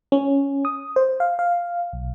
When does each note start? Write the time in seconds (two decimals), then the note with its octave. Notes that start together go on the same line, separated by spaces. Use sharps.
0.12 C#4
0.65 D#6
0.96 C5
1.20 F5
1.39 F5
1.93 B1